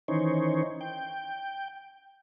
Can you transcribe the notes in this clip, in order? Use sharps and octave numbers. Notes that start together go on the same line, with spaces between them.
D#3 E3 C#4 D#4 C5 C#5
G5